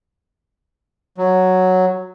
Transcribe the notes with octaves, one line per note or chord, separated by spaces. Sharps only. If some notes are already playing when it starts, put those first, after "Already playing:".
F#3